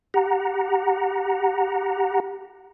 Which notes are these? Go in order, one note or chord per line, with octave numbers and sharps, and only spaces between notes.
G4 F#5 A#5